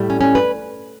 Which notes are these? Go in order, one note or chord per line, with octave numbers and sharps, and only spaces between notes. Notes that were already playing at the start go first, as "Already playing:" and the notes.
Already playing: A2 G3
C#4
C#4
B4